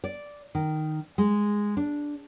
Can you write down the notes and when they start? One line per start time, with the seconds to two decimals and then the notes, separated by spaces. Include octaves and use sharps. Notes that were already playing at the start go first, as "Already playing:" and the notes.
0.04 D5
0.55 D#3
1.18 G#3
1.77 D4